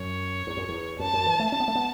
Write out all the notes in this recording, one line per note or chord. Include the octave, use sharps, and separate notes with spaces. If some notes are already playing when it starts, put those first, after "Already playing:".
Already playing: F#2 C#5
E2
F#2
E2
F#2 A5
F#2
E3
A3
C#4 A5
B3
A3
B3